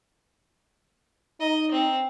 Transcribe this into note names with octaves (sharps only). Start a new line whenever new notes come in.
D#4 D#5
C4